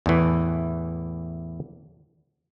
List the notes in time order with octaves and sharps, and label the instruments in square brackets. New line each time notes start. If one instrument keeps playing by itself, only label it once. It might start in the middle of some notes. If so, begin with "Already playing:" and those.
[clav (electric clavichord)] E2 A2 E3